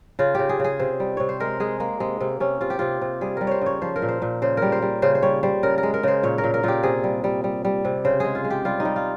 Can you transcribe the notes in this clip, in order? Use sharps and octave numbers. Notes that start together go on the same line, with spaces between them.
C#3 F4
C#3 G4
G#4
C#3 G#4
C3 C5
G3
C3 C#5
C5
G#3 A#4
G#3 G#4
G#3 A#3
C3 G#3
C3 A#3
C3 C#4
C3 F4
G4
C3 F4
C3
G3 G#4
G3 A#4
C5 C#5
C#3 C#5
F3 C5
A#4
A#2
C5
A#2
C#3 C5
G3 A#4
C5
G3
C#3 C5
C5
G3 C#5
G3 C5
C#3 A#4
A#4
G#3
A#4
C#3 C5
A#2 C#5
A#4
A#2
A#4
A#2 F4 G4
C3 G#4
G3
G3
G3
G3
C3
C#3 C5
G#3 G#4
F4
G#3
G4
G3 F4
D#4
G3
F4